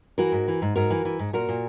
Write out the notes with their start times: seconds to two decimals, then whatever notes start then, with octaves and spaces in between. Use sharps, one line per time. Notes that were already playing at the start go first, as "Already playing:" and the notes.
0.18 E3 F#4 A#4
0.32 G#2
0.48 E3
0.62 G#2
0.76 G#2 F#4 A#4
0.90 E3
1.05 E3
1.19 G#2
1.33 A#2 F#4 A#4
1.49 A#2